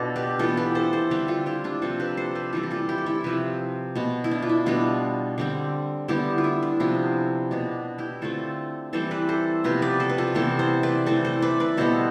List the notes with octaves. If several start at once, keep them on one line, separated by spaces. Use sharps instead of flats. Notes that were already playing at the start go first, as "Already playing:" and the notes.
Already playing: B2 B3 D4 F4 A4
G4 B4
E3 B3 F4 A4
G4 B4
A4 C5
A4 C5
D3 G3 C4 G4 B4
F4 A4
E4 G4
D4 F4
C3 F3 C4 F4 A4
G4 B4
A4 C5
G4 B4
E3 G3 C4 F4 A4
G4
F4 A4
E4 G4
A4
E4 G4
C3 F3 C4 G4 B4
B2 B3
E4
D4
F4
E4
B2 G3 B3 D4 F4
D3 G3 C4
D3 G3 B3 E4 G4
F4
E4
D4
C3 F3 B3 E4
B2 B3 D4
E4 G4
D3 A3 C4 F4 A4
E3 G3 C4 A4 C5
B4 D5
A4 C5
C3 F3 B3 G4 B4
B4 D5
A4 C5
B4
F4 A4
C3 E3 B3 A4 C5
A4 C5
B4 D5
E3 A3 C4 A4 C5
A4 C5
B4 D5
B4 D5
B2 G3 B3 A4 C5